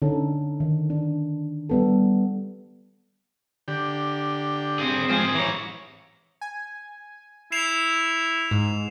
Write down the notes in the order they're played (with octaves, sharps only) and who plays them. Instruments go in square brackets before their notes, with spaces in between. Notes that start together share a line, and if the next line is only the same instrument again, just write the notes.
[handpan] D3 C#4 D#4 A4
D#3
D4
G3 B3 A4
[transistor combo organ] D3 G4
[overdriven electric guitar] C4 G#4
[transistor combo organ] F3 G#3 C5 [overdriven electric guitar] C4 G#4
[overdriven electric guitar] E3 C#5 [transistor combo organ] A#5
[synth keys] G#5
[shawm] E4 [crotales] C7 E7 F7
[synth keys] G#2